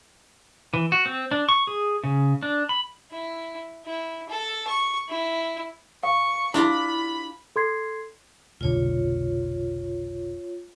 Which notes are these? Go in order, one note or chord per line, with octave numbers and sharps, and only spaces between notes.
E3
F#4
C4
D4
C#6
G#4
C#3
D4
B5
E4
E4
A4
C#6
E4
F5 C#6
D4 E4 F4 G4 A#5 B5
A4 C6 G#6 C7
F1 B1 D3 F4 C#5